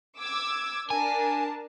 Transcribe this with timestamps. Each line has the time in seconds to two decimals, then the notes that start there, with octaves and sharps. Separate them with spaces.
0.20 D6 E6 G#6
0.90 D4 A#4 G#5 A5